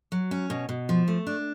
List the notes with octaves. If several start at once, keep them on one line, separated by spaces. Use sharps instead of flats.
F#3
C#4
B2
B2
F3
A3
D4